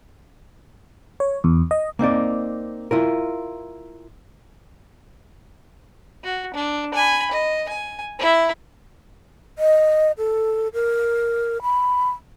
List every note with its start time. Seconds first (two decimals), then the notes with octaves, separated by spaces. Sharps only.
1.20 C#5
1.44 E2
1.71 D#5
1.99 A#3 C4 D#4 D5
2.91 E4 F4 A#4
6.24 F#4
6.54 D4
6.94 G#5 B5
7.31 D#5
7.69 G#5
8.19 E4 E5
9.59 D#5
10.18 A4
10.74 A#4
11.62 B5